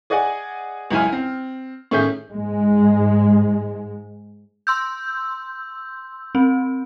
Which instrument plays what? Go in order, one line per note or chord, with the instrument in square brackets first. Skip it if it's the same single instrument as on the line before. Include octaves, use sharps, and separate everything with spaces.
[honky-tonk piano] G#4 D5 D#5 F#5 G#5
C#2 F#2 E4 G#5 F6
C4
A2 D#3 C#4 G#4 E5 G6
[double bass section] G#2 G#3
[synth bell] C6 E6 G6
C4